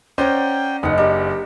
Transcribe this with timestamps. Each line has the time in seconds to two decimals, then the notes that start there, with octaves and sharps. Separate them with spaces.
0.18 C#4 C5 D5 F#5 G5 A#5
0.83 F#1 D#4 D#5 F#5
0.98 D4 G4 A#4